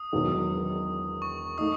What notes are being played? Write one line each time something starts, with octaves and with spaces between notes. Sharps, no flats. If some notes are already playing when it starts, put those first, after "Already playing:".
Already playing: D#6
E1 E2 D#3 F#3
C#6
A3 D#4 D#6